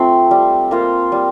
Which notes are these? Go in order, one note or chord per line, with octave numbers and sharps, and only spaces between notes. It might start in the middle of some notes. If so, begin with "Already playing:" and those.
Already playing: F3 A3 C4
G3
A#3 F4 C5
G3